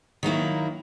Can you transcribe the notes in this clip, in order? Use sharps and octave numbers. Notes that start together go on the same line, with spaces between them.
D#3 F#3 A#3 E4